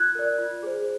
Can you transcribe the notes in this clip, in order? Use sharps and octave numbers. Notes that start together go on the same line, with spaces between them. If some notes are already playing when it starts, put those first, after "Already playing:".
Already playing: F4 F#6 G#6
A#4 D5
F4
G#4 C5